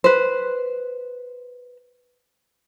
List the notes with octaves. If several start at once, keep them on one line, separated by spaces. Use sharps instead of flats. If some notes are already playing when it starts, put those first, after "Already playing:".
B4 C5